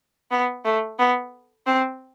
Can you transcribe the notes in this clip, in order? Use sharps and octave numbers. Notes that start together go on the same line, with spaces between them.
B3
A3
B3
C4